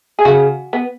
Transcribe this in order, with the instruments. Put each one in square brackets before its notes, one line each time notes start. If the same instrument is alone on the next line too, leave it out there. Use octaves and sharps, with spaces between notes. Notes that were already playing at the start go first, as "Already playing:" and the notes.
[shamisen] G#4
[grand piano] C#3 [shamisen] F#4
[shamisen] B3